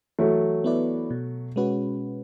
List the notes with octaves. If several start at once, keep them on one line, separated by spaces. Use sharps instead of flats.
E3 F#3 A3
B3 E4 B4 D5
B2
G#3 C#4 F#4 B4